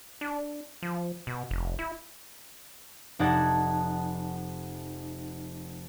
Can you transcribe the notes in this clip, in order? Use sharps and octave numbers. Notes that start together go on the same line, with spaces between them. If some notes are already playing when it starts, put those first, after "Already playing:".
D4
F3
B2
F1
E4
F1 D#4 D5 F#5 A5 G#6